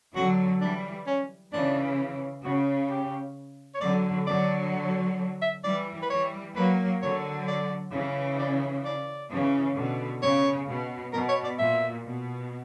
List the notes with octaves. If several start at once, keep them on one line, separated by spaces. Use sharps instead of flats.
D3 F#3 F#4
E3 G3 D4
C#4
C#3 E3 D4
C#3 F#4
G4
C#5
D3 F#3 D5
D3 F#3 D5
E5
E3 G3 D5
B4
E3 G3 C#5
F#3 A#3 B4
D3 F#3 C#5
D5
C#3 E3
D5
D5
C#3 E3
B2 D3
C#3 C#5
B2
B2 A#4
C#5
D5
A#2 E5
B2